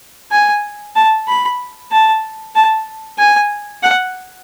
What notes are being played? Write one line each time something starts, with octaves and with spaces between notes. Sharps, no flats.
G#5
A5
B5
A5
A5
G#5
F#5